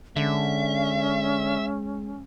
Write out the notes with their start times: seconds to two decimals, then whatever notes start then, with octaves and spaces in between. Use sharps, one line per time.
0.16 D3 G#3 C#4 E5